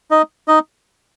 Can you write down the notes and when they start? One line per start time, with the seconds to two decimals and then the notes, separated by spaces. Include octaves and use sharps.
0.11 D#4 D#5
0.48 D#4 D#5